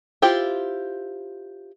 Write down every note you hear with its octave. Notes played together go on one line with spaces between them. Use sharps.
E4 F4 G4 C5